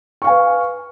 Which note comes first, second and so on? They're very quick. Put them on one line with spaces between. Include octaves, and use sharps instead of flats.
C#6 F5 G#5 B4